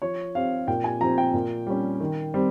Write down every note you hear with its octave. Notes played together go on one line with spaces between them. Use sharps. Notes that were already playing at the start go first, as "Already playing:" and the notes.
F3 C#5
C4 F5
A#2 G5
G#5
F3 C4 A#5
G5
A#2
G3 C#4
D#3
G3 C4